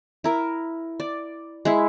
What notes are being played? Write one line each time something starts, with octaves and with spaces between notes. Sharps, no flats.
E4 A#4
D5
G#3 E4